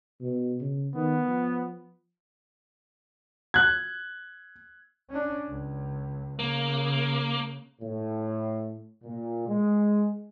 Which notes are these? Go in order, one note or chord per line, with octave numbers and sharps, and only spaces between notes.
B2
C#3
D#3 B3
F3
F#6 G#6
C#4 D4
C#2
C#3 A#3
A2
A#2
G#3